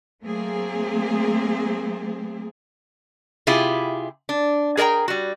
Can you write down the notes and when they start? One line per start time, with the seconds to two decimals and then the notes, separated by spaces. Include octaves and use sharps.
0.23 F#3 A3 A#3 C4 G#4
3.47 C3 E4 F4 G4 G#4
4.29 D4
4.77 G#4 A#4 D5 G5 A#5
5.08 G3 F#4